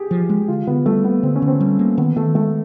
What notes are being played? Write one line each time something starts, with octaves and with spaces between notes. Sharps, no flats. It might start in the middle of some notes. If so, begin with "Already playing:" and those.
Already playing: G4 G#4
F3
G#3
D3 F4
D3 B3
G3 A3
A#3 B3
D3 C4
C#4
D3
C4
G3
A#3
D#3 B3
D#3 A3
G#3 A3